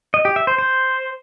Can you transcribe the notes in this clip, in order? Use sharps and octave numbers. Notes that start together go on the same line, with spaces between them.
D#5
G4
E5
C5
C5